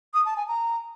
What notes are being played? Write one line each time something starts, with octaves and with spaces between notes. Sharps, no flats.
D#6
A5
G#5
A#5